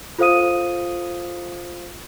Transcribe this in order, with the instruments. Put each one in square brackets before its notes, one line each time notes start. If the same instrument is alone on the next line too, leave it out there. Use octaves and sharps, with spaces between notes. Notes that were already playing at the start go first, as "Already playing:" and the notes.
[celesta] F4 A4 C5 F5 D#6 D#7